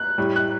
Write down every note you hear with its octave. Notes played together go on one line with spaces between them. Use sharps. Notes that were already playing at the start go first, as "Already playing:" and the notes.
Already playing: F#6
A2 G3
F#6